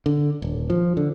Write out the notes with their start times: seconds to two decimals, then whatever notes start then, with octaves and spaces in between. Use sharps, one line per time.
0.06 D3
0.42 D#1
0.70 F3
0.97 D3